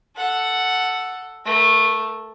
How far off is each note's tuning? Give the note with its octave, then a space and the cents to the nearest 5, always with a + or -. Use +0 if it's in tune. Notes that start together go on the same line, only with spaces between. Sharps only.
A4 +0 F#5 +0
A3 +0 A#4 +30